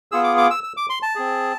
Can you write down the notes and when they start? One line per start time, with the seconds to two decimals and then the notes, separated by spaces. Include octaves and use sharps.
0.12 B3 F4 G#4 E6
0.24 D6
0.38 D6
0.51 E6
0.64 E6
0.77 D6
0.90 C6
1.02 A5
1.15 C4 G#4